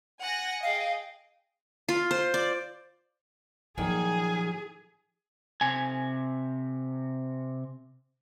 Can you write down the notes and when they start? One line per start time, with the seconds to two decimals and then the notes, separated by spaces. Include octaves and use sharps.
0.21 F#5 G#5 A#6
0.63 G#4 D#5 F5 G5
1.89 F4
2.11 C5
2.34 D5
3.78 A#2 D#3 F3 F#3 G#4 G#5
5.61 C3 G#5